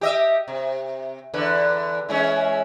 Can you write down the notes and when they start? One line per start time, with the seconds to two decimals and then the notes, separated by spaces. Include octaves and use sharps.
0.01 G4 D#5 E5
0.48 C3
1.34 E2 D3 B4
2.09 E3 G#3 C#4